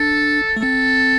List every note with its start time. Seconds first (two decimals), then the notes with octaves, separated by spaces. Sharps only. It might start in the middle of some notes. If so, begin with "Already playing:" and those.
Already playing: D4 A4
0.57 A3
0.63 C4 A4